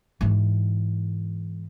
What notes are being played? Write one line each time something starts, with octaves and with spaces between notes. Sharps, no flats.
G#2 E3